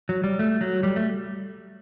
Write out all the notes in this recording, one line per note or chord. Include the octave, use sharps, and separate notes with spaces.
F#3
G3
A3
F#3
G3
A3